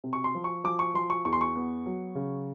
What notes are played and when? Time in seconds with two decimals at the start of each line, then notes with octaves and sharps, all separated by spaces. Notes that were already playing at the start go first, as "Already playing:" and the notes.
0.04 C3
0.13 C#6
0.24 C6
0.35 F3
0.44 C#6
0.64 F3 D6
0.79 C#6
0.94 F3 C6
1.10 C#6
1.25 E2 C#6
1.33 C6
1.41 C#6
1.56 B3
1.86 F#3
2.15 C#3